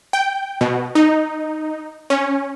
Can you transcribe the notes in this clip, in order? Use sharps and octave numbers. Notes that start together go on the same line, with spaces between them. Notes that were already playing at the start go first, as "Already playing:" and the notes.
G5
B2
D#4
C#4